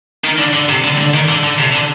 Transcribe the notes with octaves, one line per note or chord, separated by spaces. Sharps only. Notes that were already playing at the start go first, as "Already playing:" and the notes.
D#3
D3
D3
C3
D3
D3
D#3
D3
D3
C3
D3